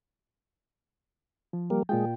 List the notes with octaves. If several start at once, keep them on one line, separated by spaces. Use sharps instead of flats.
F3
G3 A#3
A#2 G#3 F4 G5